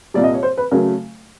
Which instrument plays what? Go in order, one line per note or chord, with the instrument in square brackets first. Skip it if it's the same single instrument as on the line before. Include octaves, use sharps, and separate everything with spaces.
[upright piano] C2 A#2 G3 D5
D#5
C#5
C5
B4
C#3 F#3 A3 A#4